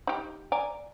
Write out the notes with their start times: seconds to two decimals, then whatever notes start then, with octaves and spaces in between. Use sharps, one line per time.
0.07 D#4 G4
0.52 D5 G#5 A#5